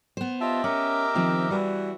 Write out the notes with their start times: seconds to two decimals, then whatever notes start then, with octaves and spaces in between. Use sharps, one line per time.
0.17 B3 C5
0.41 F4 G4 D#5 E5 A5
0.64 C#4 A#4 D6
1.15 D#3 F3 C4
1.51 E3 G3 F#4